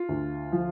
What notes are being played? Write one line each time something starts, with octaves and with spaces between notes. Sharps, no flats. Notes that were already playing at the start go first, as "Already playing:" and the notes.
Already playing: F4
D2
F3